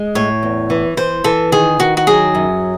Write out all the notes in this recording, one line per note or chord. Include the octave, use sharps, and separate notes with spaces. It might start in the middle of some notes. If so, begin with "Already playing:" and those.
Already playing: G#3
A2 C#5
E2
E3
E3 C5
E3 A4
D#3 G#4
D#3 F#4
F#4
F#3 G#4
F#2